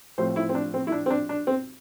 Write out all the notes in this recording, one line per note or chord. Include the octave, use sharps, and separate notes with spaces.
A2 F3 C4 C5
E4
C4
D4
C4
E4
D4
C4
D4
D4
C4